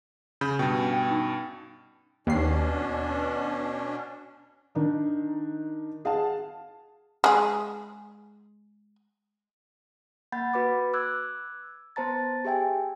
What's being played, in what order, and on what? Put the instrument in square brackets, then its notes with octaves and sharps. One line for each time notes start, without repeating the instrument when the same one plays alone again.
[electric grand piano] C#3 B5 G6
[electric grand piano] G2 B2 [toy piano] G5
[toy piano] C#4 G#5
G5
D#4
[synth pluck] D#2 C7 [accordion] B2 C#4 D4
[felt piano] D#3 D4 D#4
G#4 F5 F#5 A5
[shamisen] G#3 G#4
[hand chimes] A#3 F#5 B5 G6 A6
F#4 B4 B5 D6
D6 E6 F#6 G#6
B3 C5 A5 A#5 A6
G4 G#4 E5 G5 G#5